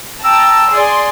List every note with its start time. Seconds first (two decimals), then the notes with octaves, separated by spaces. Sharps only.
0.24 G5 A5 A#5 E6
0.71 G#4 D5 C6